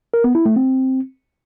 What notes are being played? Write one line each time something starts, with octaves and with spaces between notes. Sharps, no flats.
A#4
B3
E4
A3
C4